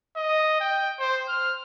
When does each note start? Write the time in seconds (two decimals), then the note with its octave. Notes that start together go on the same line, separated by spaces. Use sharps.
0.16 D#5
0.60 G5
0.99 C5
1.29 F6